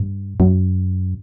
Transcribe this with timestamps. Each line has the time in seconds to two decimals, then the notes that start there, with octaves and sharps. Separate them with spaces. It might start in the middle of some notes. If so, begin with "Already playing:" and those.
Already playing: G2
0.40 F#2